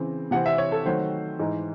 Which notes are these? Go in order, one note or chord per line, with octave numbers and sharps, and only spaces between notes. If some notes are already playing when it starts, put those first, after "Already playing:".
Already playing: C#3 E3 C4
C3 E3 C4 F#5
E5
C#5
A4
D#3 F#3 A3 C5
G#2 E3 G#3 D#4